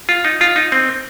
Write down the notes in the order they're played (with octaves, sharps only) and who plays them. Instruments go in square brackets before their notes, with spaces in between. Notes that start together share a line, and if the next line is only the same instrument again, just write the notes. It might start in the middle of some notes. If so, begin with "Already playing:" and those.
[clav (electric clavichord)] F4
D#4
F4
D#4
C4